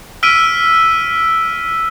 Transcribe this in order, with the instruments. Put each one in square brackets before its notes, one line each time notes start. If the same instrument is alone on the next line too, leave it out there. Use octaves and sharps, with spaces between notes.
[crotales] E6 F6 B6 D7 D#7